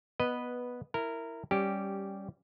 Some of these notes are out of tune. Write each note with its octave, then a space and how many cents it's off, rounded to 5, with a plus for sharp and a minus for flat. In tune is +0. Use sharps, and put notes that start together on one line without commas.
B3 -10 B4 +0 D#5 -10
E4 +0 A#4 -15
G3 +0 C#4 +0 G4 -10